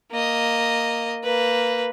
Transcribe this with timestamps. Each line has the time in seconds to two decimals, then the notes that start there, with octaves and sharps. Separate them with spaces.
0.12 A#3 D#5
1.24 A#3 B4